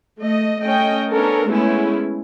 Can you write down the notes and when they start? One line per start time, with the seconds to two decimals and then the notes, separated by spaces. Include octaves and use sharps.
0.20 A3 D#5
0.61 A3 C#4 D#5 G5
1.11 B3 C#4 D4 A4 A#4
1.47 G#3 A3 B3 C#4 E4